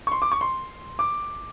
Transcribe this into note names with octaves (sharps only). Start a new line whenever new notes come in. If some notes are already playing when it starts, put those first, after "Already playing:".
C#6
C6
D6
C#6
C6
D6